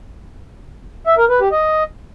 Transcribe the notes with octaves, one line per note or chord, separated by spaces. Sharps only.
E5
A#4
B4
G4
D#5